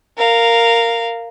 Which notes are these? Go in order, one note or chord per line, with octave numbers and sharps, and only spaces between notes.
A#4 F5